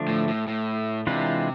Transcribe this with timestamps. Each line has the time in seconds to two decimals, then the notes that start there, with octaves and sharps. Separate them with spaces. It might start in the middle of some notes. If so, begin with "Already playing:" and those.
Already playing: D3 F3 A3 D4
0.08 A2
0.28 A2
0.47 A2
1.07 C3 E3 G#3 D4 F4 B4